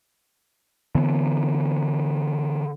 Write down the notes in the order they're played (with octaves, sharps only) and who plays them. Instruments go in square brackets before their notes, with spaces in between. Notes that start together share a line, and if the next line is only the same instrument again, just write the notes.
[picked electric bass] D3 E3 B3